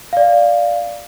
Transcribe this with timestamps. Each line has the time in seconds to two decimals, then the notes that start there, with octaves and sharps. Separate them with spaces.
0.13 D5 F5